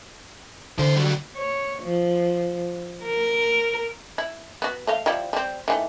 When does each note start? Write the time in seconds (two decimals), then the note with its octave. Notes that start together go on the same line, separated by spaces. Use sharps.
0.79 D3 E3 C5
0.96 F#3 G3
1.36 C#5
1.82 F3
3.04 A#4
4.18 E4
4.62 B3 F#4
4.87 A3 D#5 F5
5.06 F3 G3 E4
5.33 G3 C4
5.68 D#3 E3 A3